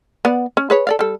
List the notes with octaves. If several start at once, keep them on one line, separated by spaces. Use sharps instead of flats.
B3 D5 F#5
C#4
G#4 B4 C#5
A4 D5 F5
G3 A4